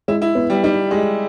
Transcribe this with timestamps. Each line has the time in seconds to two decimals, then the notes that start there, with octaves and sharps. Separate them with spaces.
0.08 G#3 E4
0.22 E4
0.35 B3
0.50 G3
0.63 G3 D#4
0.91 G#3 G4